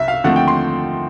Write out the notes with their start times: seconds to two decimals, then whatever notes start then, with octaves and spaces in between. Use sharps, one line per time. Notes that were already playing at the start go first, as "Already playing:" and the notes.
Already playing: C2 E5
0.08 F5
0.24 D#2 D3 F3 A3 C4 F#5
0.36 G5
0.48 C6